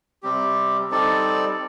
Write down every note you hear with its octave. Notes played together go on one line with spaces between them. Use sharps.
C3 G3 C4 G4
G3 C4 D#4 A4 D5